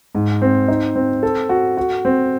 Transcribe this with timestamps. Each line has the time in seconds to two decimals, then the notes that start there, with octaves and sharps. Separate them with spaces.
0.15 G#2
0.42 C4
0.68 D#4
0.95 C4
1.23 A4
1.49 F#4
1.77 F#4
2.05 C4